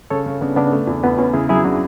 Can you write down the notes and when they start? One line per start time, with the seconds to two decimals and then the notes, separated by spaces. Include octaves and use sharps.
0.10 C#3 A4 C#5
0.26 C#3
0.41 C#3 B3 D4
0.56 C#3 B3 D4
0.72 A3
0.87 E2
1.03 E2 B3
1.18 E2 C#4
1.33 C#3 E4 G#4
1.49 F#3 E4 G#4
1.65 C#3 D4 F#4